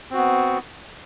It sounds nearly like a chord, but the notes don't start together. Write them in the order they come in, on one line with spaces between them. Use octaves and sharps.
C4 F#4 B3